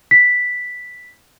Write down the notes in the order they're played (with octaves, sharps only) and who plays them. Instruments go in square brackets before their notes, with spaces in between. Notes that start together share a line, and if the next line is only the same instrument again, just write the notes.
[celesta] B6